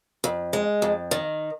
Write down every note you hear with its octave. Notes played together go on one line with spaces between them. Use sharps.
F2
G#3
F2
D#3